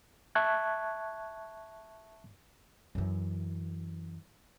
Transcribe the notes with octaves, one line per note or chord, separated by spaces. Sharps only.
E5 A5 C#6 F#6 G#6
F#2 E3